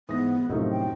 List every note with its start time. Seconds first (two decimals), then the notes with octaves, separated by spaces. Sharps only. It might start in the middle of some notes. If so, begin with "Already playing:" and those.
0.09 G#2 E3 B3 D#6 A#6
0.49 F#2 A2 C3 F3 C#4 D#4 A4
0.70 G5